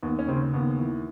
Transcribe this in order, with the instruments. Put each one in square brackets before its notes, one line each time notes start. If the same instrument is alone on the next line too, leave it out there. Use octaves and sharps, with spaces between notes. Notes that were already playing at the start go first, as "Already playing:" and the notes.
[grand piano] D#2 B3
C#4
C#3 C4
D#2 B3
E3